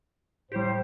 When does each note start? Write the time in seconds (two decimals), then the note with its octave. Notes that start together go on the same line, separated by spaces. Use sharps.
0.52 A2 G3 G4 C5